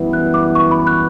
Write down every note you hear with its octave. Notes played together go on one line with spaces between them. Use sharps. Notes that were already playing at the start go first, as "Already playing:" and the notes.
Already playing: F#2 E3 G3 B3 E4
F#6
D6
C#6
B5
F#6